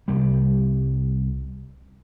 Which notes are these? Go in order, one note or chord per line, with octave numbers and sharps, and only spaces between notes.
C2 G3